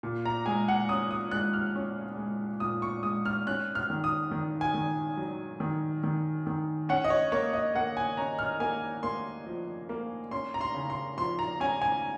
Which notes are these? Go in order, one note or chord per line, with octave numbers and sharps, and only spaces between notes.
A#2
A#5
G#3 G#5
F#5
C#4 D#6
D#6
G#3 F#6
F6
C#4
G#3
A#2 D#6
C#6
G#3 D#6
F6
C#4 F#6
F6
D#3
D#6
D#3
G#5
D#3
F#3
D#3
D#3
D#3
C#4 F#5
D#5
C#5
A#3 C#5
D#5
A#3 F#5
G#5
C#4 A#5
F6
A#3 G#5
A#3 C6
F3
A#3
C#4 C6
A#5
C6
C#3
C6
F3 C6
A#5
C#4 G#5
G#5